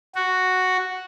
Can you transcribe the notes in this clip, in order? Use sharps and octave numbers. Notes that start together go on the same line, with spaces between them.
F#4